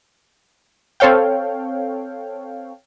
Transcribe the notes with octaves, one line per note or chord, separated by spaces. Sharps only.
C4 A4 C#5 F5 G5